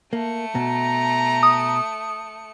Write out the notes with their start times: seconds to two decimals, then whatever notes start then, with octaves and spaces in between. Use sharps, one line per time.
0.13 A3 A#3 C#7
0.55 B2 A#5
1.43 D#6